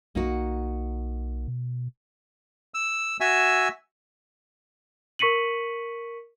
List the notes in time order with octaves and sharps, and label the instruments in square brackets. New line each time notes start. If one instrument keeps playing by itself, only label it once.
[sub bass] B1 [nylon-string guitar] A#3 D#4 F#4
[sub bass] B2
[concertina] E6
F#4 E5 G#5 E6
[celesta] A#4 C#6 B6 C#7 D#7 F#7